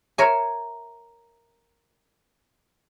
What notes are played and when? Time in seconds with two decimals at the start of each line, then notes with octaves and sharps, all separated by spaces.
0.18 A#4 C#5 E5 G#5